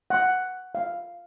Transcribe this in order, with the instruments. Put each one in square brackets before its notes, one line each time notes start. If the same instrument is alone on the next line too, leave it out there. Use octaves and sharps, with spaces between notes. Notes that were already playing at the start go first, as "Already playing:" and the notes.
[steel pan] F#5
F5